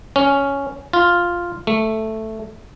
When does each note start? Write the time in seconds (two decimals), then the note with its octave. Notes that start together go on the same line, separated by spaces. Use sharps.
0.16 C#4
0.93 F4
1.67 A3